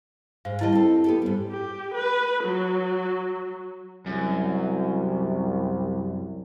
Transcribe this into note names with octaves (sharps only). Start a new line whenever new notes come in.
G#2 F5
D#3 G3 E4 D#5 A5
C4 A4
B3 G4 A4
G#2 G3
G4
B4
F#3
C2 F#2